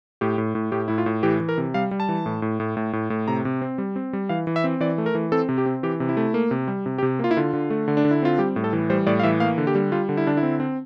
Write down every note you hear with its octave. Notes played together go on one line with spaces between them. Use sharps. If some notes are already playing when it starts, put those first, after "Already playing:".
A2 G4
A2
A2
A2 G4
A2 E4
F4
A2
E3 G4
E3
A#4
C3
G3 F5
G3
A5
E3
A2
A2
A2
A2
A2
A2
C3 A#5
C3
C4
G3
C4
G3
E3 F5
E3
E5
C4
E3 D5
A3
A#4
E3
C4 A4
C3
G4
C4
E3 G4
C3
E4
A3
A#3
C3
G3
C3
G4
C3
A#3 F4
E4
D3 F4
D3
A3
D3
D4
D3
E4
C4 F4
G3 G4
A2
A4
E3
G3 C5
A2 D5
F5
E3 E5
A#3 F5
D3
G4
G3
G3 F4
D3
E4
D3 D4
E4
C4
C4